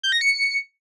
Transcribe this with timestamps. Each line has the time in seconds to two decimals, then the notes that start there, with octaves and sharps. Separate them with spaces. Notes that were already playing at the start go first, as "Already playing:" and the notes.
0.03 G6
0.12 A#6
0.21 C#7